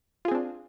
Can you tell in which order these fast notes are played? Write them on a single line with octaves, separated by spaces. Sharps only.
F4 G#4 C4 D4